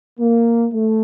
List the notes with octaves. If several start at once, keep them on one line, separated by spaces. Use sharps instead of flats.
A#3
A3